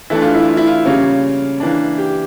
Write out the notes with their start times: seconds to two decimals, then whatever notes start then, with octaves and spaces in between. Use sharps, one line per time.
0.10 E3 A3 D4 E4
0.22 F4
0.34 E4
0.48 F4
0.57 E4
0.67 F4
0.85 C#3 G3 A#3 C#4
1.60 E3 A#3 D4
1.98 G4